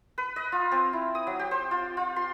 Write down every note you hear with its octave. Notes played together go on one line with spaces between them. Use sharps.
B4
D#5
F4
C4
E4
D#6
F#3
G4
C5
F4
F4
C6